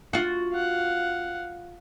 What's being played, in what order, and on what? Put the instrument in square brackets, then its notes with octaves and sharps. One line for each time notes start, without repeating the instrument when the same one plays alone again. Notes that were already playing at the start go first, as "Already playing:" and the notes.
[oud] F4 F#4
[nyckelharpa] F5 F#5